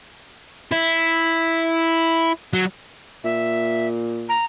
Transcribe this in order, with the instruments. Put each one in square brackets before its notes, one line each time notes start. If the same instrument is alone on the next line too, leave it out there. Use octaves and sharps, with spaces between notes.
[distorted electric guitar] E4
F#3
[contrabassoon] A#2 [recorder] E5
[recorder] A#5